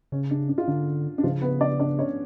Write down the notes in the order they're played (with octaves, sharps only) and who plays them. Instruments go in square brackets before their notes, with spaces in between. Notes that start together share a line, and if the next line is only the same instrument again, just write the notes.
[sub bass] C#3 [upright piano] C#4
[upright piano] D4
D4
F4
[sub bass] D3 [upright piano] D4
[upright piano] D4
[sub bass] C#3 [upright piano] F3 F4
[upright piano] B3 B4
D4 D5
D4 D5
C#4 C#5